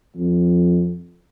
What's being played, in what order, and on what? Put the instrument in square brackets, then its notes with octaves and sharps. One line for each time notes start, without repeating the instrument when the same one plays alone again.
[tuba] F2